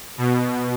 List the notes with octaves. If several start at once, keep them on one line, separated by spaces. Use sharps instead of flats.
B2